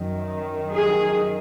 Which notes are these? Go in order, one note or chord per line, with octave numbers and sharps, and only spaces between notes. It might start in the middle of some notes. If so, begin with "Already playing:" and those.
Already playing: F#2 D#3
G#4